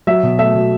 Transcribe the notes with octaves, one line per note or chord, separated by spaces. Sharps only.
F#3 E5
B2
A3 E5
B2